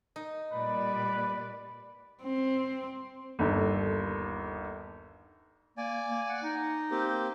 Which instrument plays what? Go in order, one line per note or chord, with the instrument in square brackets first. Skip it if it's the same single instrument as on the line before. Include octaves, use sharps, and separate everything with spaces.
[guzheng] D#4
[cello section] A#2 G3 D5 [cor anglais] B4
[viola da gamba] C4
[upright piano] G1 D#2 A4
[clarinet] A#3 [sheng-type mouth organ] D5 G#5
[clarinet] A#3
F#5
D#4
[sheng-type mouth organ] A#3 C4 G4